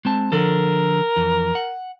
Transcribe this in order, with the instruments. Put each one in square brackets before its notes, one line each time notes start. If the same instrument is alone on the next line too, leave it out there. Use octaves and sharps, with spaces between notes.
[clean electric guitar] G#3 C4 A5
[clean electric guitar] D3 F3 A4 [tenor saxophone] A#4
[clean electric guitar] F2 E3
F#5